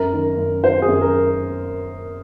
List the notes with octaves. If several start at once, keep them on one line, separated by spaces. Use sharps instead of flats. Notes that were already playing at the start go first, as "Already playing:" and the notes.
Already playing: F#2 A#4
D#3
F#2
D#3 C5
G#4
F#2
A#4